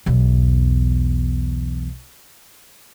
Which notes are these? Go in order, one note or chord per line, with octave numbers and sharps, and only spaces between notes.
B1 E2